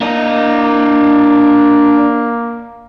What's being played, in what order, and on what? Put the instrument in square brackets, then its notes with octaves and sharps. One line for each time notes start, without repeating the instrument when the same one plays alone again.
[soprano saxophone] A#3 [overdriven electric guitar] D4 D#5